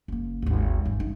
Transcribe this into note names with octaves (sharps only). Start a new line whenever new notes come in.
F#1 A#3
G#1 D#2
G#1 G3
D#4